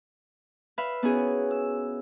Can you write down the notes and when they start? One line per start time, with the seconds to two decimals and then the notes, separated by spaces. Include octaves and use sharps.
0.78 B4 E5 F5 B5
1.03 B3 C#4 D#4 E4 F#4 G#4
1.51 E6